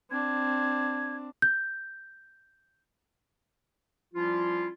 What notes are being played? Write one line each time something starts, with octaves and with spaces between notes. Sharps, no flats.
C4 D4 G#6
G6
F3 G3 C#4 E4 F4